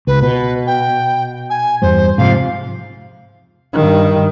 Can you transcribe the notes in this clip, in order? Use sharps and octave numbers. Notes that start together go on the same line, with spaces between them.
C#2 B4
B2 B4
G5
G#5
E2 G2 C5
G#2 C3 F3 F5
G2 D#3